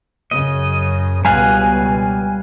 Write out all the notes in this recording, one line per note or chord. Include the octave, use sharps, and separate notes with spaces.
F#2 C#3 D#5
C#2 B2 G3 F5 F#5 G#5